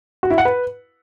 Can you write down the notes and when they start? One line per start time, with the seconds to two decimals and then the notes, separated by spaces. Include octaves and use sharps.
0.23 F#4
0.30 E4
0.38 F#5
0.45 B4